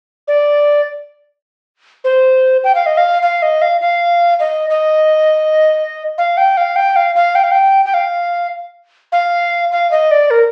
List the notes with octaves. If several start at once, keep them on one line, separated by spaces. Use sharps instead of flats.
D5
C5
G5
F5
D#5
F5
F5
D#5
F5
F5
D#5
D#5
F5
G5
F5
G5
F5
F5
G5
F5
G5
G5
F5
F5
F5
D#5
D5
A#4